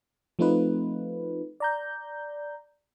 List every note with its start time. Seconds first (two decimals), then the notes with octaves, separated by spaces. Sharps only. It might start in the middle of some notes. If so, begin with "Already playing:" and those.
0.39 F3 A3 C4 D#4 F4 B4
1.60 D5 A#5 G6